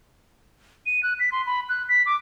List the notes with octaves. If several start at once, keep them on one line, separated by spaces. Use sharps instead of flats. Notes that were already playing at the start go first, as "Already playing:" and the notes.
D#7
F#6
B6
C6
B5
F#6
B6
D6